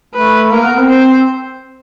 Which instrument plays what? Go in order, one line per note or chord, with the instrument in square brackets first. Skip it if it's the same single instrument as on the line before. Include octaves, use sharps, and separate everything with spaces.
[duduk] A3 [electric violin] B4
[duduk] A#3 [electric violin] A#4
[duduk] B3
C4
[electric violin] C5